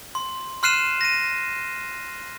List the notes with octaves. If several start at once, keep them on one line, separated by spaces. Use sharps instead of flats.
C6
C6 F6 F#6 C7 D#7 E7
A#6 D#7